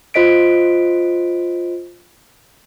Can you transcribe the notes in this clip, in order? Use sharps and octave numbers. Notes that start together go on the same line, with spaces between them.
F4 C5 D#5 B6 D7